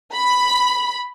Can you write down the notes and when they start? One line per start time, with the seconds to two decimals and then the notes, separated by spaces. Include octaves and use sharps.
0.14 B5